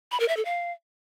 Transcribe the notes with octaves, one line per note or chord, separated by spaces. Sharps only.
B5
A#4
E5
A4
F5